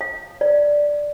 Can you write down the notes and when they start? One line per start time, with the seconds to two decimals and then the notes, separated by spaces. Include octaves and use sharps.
0.01 F5
0.41 D5